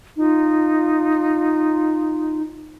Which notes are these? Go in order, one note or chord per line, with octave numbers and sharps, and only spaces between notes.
D#4 F4